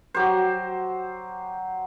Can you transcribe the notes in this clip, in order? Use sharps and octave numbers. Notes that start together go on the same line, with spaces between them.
F#3 G4 C5